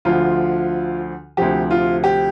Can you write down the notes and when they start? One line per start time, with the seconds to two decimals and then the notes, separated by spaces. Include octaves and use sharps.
0.05 D2 D3 F3 F4
1.37 D2 C3 F3 G4
1.71 F4
2.04 G4